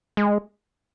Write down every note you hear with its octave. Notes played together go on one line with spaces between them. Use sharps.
G#3